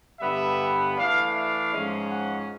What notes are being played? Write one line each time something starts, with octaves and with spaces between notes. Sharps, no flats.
G2 D3 G3 B3 E5
E3 A3 D4 F5
F5
G#2 F3 G#3 C#4
F#5